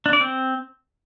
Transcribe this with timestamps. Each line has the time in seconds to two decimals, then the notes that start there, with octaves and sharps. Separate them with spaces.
0.06 D4
0.13 D5
0.20 C4